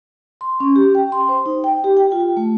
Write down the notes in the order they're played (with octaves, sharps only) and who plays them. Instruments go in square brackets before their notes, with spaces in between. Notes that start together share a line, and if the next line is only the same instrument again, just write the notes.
[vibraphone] C6
C#4
G4
G5
C6
C5
D#4
G5
G4
G5
F4
A3